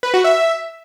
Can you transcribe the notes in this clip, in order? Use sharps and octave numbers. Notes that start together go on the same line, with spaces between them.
B4
F#4
E5